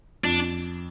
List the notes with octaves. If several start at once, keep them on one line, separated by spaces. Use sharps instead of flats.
F2 D4